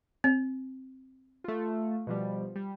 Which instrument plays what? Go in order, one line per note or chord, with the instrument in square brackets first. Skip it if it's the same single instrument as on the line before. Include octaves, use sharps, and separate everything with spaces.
[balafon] C4
[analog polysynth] A3 F4
B2 F3 G3
G3